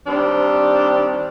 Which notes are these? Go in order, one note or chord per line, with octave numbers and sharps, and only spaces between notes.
D#3 G3 C4 D4